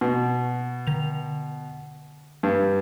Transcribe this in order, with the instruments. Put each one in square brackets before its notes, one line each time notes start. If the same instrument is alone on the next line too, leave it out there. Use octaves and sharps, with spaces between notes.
[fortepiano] B2
[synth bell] D3 F7
[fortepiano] G2